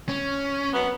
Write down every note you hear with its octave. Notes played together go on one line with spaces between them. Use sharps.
C#4
F#2 B3